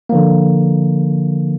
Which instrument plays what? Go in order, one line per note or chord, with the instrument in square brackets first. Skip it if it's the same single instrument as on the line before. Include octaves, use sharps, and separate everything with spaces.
[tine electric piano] D3 F3 A#3